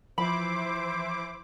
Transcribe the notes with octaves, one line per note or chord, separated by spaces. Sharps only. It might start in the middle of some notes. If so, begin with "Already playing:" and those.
E3 F3 E4 C5 B5 D6